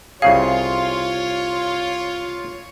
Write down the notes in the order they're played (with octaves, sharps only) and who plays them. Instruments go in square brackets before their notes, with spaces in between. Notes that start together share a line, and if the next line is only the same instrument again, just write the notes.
[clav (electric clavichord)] C2 C#3 G#4 [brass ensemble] F4 [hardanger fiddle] C#5 [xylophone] F5